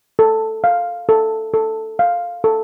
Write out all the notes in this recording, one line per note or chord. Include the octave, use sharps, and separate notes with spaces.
A4
F5
A4
A4
F5
A4